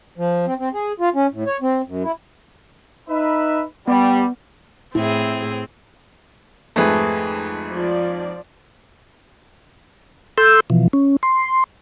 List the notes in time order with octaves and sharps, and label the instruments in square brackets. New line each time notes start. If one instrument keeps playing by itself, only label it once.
[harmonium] F3
C4
C4
G#4
F4
C#4
A2
C#5
C4
F#2
E4
[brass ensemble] D#4 B4 E5
[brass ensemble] G3 [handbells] B3
[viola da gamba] A2 G#4 [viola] C4 [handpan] E4
[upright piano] F2 G#2 [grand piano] A3 G#4 B4
[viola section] F3 D5
[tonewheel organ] A4 C6 E6 G6
B2 E3 F3
C#4
C6